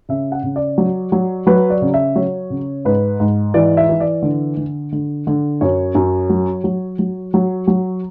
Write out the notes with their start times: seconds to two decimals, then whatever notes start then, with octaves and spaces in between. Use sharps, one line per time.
0.09 C#3 E5
0.32 F#5
0.43 C#3
0.56 D5
0.78 F#3
1.12 F#3
1.47 F#3 B4
1.70 D5
1.82 C#3
1.94 E5
2.16 F#3 C#5
2.50 C#3
2.85 G#2 B4
3.20 G#2
3.54 E3 D5
3.77 E5
3.89 E3
4.00 D5
4.22 D3
4.57 D3
4.92 D3
5.27 D3
5.61 F#2 C#5
5.95 F#2
6.29 F#3
6.64 F#3
6.99 F#3
7.34 F#3
7.67 F#3